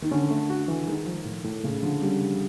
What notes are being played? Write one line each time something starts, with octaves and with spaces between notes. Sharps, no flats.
D#3
D3 C#4
A3
F#4
E3
D#3 G#3
F3
A2
A2
C#3 A3
D3 F3
G3 C#4
C#3